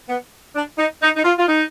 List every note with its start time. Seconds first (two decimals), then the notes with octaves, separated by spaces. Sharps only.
0.09 B3
0.55 D4
0.78 D#4
1.02 D#4
1.16 D#4
1.24 F4
1.38 F4
1.48 D#4